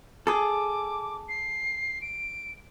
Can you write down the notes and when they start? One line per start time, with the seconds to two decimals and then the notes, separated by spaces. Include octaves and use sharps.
0.27 G#4 A4 D6
1.29 C7
2.02 D7